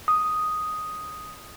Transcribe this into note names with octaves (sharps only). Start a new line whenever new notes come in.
D#6